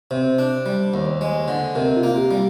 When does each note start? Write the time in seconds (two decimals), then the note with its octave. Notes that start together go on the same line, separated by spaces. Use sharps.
0.11 C3 C5
0.39 D4
0.66 G3
0.94 D#2
1.21 G#3
1.48 D3
1.75 C3 A#4
1.97 F4
2.03 A#3
2.12 F4
2.17 G4
2.31 G3